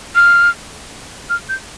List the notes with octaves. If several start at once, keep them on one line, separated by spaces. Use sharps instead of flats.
F6
F6
G6